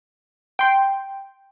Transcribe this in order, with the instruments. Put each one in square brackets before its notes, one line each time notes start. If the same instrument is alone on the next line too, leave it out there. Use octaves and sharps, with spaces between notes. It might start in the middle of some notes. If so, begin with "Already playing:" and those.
[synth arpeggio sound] G5 C6